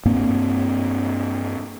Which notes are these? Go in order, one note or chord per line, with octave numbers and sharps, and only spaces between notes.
G2 A#3 C4